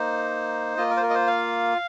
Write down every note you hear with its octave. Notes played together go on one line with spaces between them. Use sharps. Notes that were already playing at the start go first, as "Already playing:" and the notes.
Already playing: A#3 D#4 C5
A#3 F4 D#5
A#4
C5
A#4
D#5
C5
F5